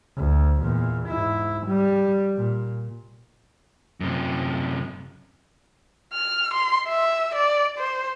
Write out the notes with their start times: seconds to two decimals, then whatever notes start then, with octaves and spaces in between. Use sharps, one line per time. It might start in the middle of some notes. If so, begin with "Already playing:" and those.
0.17 D2
0.61 E2 A#2
1.09 G#2 E4
1.67 G3
2.36 A#2
4.00 F#2 C3
6.13 F6
6.54 C6
6.89 E5
7.35 D5
7.78 C5